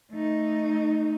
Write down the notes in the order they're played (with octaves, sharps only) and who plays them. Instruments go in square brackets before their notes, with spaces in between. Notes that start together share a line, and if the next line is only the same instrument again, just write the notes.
[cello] A3 D#4